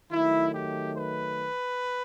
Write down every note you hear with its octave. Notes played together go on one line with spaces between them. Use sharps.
D#3 F#3 A3 E4
G4
B4